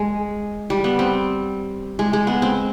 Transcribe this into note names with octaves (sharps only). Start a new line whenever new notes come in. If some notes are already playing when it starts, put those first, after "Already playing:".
Already playing: G#3
G3
B3
C4
G#3
G#3
B3
C4